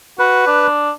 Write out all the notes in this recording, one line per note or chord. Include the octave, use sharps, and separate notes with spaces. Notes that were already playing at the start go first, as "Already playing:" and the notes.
F#4 B4
D4